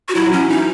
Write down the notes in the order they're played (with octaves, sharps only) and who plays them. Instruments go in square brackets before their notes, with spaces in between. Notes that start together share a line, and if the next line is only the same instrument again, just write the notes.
[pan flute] F#4
[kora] F#3 [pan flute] E4
[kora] F#3
[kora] E3 [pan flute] C#4
[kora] E3 [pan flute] D#4